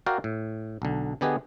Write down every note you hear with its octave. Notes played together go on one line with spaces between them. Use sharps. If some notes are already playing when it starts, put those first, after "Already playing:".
F#4 A#4 D5 F5 G5
A2
B1 D3
D3 B3 G4 G#4 B4 D#5